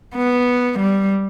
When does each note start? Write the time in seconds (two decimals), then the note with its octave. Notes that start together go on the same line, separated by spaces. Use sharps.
0.16 B3
0.80 G3